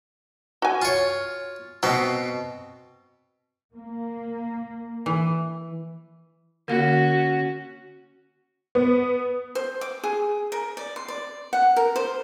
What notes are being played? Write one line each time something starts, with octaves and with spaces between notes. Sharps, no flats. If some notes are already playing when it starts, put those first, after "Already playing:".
F#4 G#5
F4 C#5
B2 B3 C4 F#4
A#3
E3
D3 A#3 C#4 F#4
B3
C5
D6
G#4
A#4
D5
C6
D5
F#5
A#4
C5